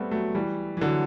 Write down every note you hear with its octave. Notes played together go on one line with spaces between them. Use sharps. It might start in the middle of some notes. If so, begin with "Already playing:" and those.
Already playing: G3 A3 B3 C4
F#3 A3
E3 G3
E3
D3 F#3